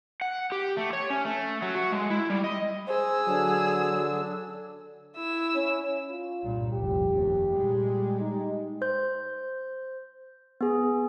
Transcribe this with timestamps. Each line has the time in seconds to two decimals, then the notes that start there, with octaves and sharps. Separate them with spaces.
0.21 F#5
0.52 G4
0.77 A3
0.93 C#5
1.10 C#4
1.25 A3
1.62 F#3
1.75 F#4
1.92 G#3
2.10 E4
2.30 G3
2.44 D#5
2.88 G#4 C5 E6
3.27 D3 F#3 D4
5.17 E4 E6
5.55 C#4
6.10 F4
6.43 C2 G2 A#2
6.73 F1 C2 G4
7.11 F1 D#2
7.51 A#2 G3 G#3
8.20 D#4
8.82 C5 G6
10.61 B3 G#4